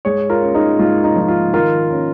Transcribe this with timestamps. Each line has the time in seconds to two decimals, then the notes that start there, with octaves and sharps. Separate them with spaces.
0.05 G#2 G#4 C#5
0.30 F4 A#4
0.42 C#4
0.55 D#4 G#4
0.79 G#2 F4
1.04 D#4
1.16 F3 D#4
1.28 F4
1.54 D#3 F4 A#4
1.90 C#4